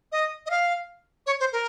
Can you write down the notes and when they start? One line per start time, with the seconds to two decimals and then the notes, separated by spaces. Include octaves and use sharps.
0.12 D#5
0.46 D#5
0.50 F5
1.26 C#5
1.40 C5
1.52 A#4